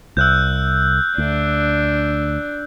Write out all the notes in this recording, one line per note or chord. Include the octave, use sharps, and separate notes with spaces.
C2 E6 F#6 G6
D2 D4